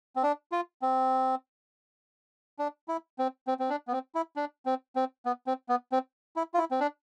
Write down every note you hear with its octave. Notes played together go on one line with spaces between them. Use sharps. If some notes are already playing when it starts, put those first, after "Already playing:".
C4
D4
F4
C4
D4
E4
C4
C4
C4
D4
B3
C4
E4
D4
C4
C4
B3
C4
B3
C4
E4
F4
E4
C4
D4